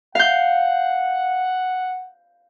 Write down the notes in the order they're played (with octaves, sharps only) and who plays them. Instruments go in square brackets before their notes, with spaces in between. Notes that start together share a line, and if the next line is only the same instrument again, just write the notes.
[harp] F5 G6 [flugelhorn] F#5